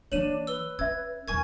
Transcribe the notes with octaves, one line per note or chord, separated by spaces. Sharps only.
E3 A#3 D4 C#5 D#7 E7 F#7
B4 E6 G7
C#4 E5 E6 G#6
E2 D#4 A#4 G#5 C#6 G#6